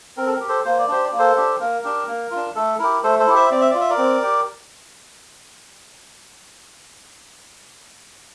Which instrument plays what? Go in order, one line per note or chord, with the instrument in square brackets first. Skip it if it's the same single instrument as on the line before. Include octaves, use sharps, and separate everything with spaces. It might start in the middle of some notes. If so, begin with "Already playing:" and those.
[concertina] C4 A#4
A4
A#4
G4
A4 C5
A#3 C5
D5
D4 G4 C5
D5
A#3
A4 C5
D4 G4
A#3 A#4
D4 G4
A#3
F4
D4
A3 A4
E4 G4 A#4
A3 A4 C5
A4 C5
E4 G4
C5 E5
C4 D5
E5
F4 D5
E5
A#4 D5
C4
G4